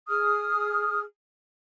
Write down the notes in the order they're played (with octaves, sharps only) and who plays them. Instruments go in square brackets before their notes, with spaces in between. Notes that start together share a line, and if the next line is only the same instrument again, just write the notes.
[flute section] G#4 D#6 F6